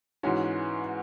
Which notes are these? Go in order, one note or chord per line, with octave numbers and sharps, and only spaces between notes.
G#2 E3 G#3 C#4 F#4